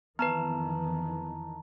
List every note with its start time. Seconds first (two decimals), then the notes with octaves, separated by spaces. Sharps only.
0.19 F2 D#3 E3 B3 B4 A5 A#5